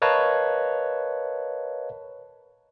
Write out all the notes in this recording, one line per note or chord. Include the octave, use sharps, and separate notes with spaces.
A#4 B4 C#5 D#5 F5 A5